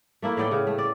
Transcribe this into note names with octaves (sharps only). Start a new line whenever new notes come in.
A3 A#3 E4
A2 B3 D5 G5
C#3
A3
D5